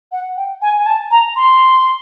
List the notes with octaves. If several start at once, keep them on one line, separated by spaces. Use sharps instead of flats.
F#5
G5
G#5
G#5
A5
A#5
C6